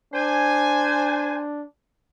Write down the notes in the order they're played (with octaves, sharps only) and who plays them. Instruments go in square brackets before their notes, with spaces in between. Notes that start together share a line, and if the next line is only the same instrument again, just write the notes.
[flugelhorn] D4 [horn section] C5 G#5